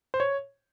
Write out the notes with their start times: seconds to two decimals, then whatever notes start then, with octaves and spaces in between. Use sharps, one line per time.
0.14 C5
0.20 C#5